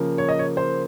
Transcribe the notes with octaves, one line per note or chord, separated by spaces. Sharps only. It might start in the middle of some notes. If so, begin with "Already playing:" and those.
Already playing: C#3 F3 A#3
C#5
D#5
C#5
C5